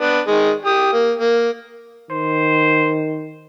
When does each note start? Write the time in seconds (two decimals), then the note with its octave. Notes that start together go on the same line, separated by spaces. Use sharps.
0.01 B3 D4
0.27 D#3 G#3
0.66 G4 D#6
0.93 A#3
1.19 A#3
2.11 D#3 C5